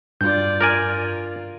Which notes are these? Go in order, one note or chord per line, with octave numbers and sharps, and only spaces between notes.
G2 F4 D5 G6
F4 A#4 D5 G#5